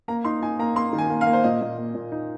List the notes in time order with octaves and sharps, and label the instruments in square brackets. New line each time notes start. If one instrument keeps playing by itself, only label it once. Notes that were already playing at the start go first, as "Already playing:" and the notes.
[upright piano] A#3 [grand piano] A#5
[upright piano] D#4 [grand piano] C6
[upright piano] D#4 [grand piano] G#5
[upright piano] A#3 [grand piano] A#5
[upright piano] A#3 [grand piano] C6
[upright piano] D#3
[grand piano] G#5
[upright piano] A#3
[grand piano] F5
[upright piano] A#3
[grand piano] C5
[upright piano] A#2 [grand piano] D#5
[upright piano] A#2
A#3
A#2
D#4